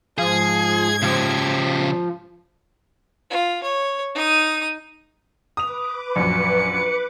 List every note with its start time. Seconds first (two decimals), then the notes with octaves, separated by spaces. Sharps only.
0.18 G#2 F3 G#4 G#6
1.02 C#3 F3 G4
3.30 F4
3.63 C#5
4.15 D#4 D#6
5.57 B4 D6 D#6 F7
6.16 A#1 F#2 C#7